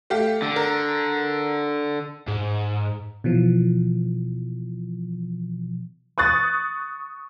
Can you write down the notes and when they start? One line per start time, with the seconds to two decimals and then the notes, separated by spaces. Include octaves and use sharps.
0.10 A3 G4 F5
0.42 D3
0.56 A#4
2.28 G#2
3.24 B2 E3 F3
6.18 C#6 D#6 F#6 A6